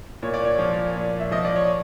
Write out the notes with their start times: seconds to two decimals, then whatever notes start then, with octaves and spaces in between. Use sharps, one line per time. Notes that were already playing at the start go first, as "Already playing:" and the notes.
0.23 A#2 C#5
0.34 D5
0.45 C#5
0.59 F3
0.96 A#2
1.20 E5
1.31 F3 D#5
1.45 D5
1.56 C#5